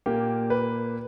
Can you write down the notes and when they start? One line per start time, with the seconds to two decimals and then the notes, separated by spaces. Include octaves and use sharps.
0.06 A#2 A#3 G4
0.50 B4